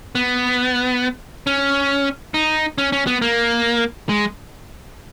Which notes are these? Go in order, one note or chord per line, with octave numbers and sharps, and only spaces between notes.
B3
C#4
D#4
C#4
C#4
B3
A#3
G#3